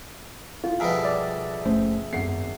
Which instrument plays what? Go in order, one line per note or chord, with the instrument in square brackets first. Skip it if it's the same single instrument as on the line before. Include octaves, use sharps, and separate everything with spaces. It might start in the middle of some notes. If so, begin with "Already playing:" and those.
[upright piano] F4
[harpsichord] F2 B2 G3 [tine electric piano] G#4 A#4 E5
[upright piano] D5
[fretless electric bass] F#1 A3 C#4 [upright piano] C5
[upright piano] G#1 C7 [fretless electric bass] F#2 B3